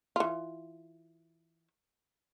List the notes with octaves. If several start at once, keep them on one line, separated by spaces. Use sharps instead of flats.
E3 F4